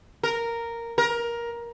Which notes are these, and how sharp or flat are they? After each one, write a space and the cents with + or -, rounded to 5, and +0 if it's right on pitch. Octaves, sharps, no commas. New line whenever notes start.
A#4 -5
A#4 +15